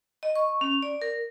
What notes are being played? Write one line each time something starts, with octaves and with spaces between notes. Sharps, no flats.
D#5
C#6
C#4
D5
A#4